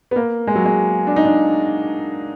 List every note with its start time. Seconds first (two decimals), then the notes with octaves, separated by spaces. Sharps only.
0.11 B3
0.16 A#3
0.47 G#3
0.56 F#3
0.65 G#3
1.07 D4
1.16 D#4
1.25 D4